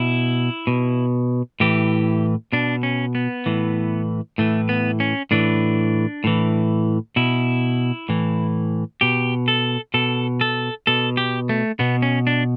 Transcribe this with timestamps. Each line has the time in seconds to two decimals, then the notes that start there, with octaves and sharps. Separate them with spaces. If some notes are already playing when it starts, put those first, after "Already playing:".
Already playing: B2 E4
0.67 B2
1.60 A2 E3 G4
2.52 B2 D4
2.83 C#4
3.15 B3
3.46 A2 E3
4.38 A2 E3 A3
4.69 B3
5.00 C#4
5.31 A2 E3 D4
6.24 A2 E3
7.16 B2 E4
8.09 A2 E3
9.01 B2 G4
9.48 A4
9.94 B2 A4
10.41 A4
10.87 B2 A4
11.17 G4
11.49 A3
11.79 B2 B3
12.02 C#4
12.27 D4